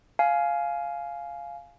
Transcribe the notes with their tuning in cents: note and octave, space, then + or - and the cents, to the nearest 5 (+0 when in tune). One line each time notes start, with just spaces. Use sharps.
F5 +0 G#5 +15